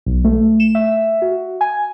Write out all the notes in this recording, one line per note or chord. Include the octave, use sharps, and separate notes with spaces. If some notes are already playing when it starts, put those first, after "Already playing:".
B1
A3
E7
E5
F#4
G#5